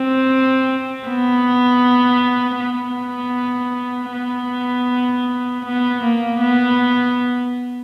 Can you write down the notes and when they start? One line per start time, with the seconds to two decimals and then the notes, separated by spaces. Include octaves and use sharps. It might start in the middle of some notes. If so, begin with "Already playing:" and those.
Already playing: C4
1.07 B3
2.60 B3
4.12 B3
5.64 B3
6.02 A#3
6.40 B3